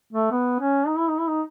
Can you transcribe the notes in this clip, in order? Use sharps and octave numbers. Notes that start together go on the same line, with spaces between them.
A3
B3
C#4
D#4
E4
D#4
E4
D#4